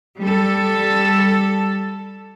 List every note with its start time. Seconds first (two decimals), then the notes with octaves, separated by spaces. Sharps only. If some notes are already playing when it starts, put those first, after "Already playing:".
0.21 G3 A4